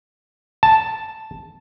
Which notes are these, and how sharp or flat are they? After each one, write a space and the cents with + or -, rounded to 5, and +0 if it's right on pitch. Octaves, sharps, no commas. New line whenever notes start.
A5 +0